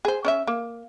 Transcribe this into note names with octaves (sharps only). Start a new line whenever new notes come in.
G#4 C5
C#4 D5 E5
A#3